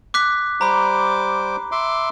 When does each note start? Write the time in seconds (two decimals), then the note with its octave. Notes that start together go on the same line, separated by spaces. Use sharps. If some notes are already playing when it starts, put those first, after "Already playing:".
0.14 D6 F#6 B6
0.61 G3 C5 A#5 B5 D6
1.72 E5 C6 D6